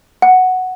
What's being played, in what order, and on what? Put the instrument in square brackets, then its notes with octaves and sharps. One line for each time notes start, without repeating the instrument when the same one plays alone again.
[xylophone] F#5